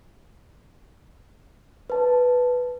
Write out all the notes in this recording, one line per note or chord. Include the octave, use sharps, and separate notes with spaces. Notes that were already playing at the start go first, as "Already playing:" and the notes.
B4 A5